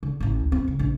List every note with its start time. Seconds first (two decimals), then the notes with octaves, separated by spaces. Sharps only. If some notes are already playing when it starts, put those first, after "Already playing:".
0.03 D3
0.20 A1 A2
0.39 D2
0.52 C4
0.64 A2 C#3
0.79 A#1